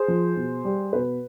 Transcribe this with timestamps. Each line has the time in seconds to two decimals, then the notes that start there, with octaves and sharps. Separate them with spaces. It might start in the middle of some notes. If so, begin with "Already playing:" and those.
Already playing: G#4 C5
0.08 F3
0.36 B2
0.65 G3
0.93 B2 B4